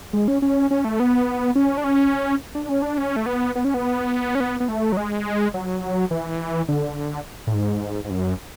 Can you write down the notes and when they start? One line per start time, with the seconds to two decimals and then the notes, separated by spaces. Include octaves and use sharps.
0.13 G#3
0.28 C#4
0.42 C#4
0.71 C#4
0.85 A3
1.00 B3
1.55 C#4
1.78 D4
1.84 C#4
2.55 D4
2.69 C#4
2.82 D4
2.98 C#4
3.16 A3
3.26 B3
3.55 B3
3.65 C#4
3.74 B3
4.35 C#4
4.40 B3
4.60 B3
4.69 A3
4.92 F#3
4.97 G#3
5.54 F#3
6.11 E3
6.68 D3
7.47 A2
7.54 G#2
8.04 G#2
8.10 F#2